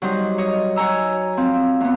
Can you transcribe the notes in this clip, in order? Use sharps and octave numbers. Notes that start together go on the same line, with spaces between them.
F#3 G3 D#4 C5
C#5 D#5
F#4 C#5 G#5 A#5 E6
F3 C4
E2 B3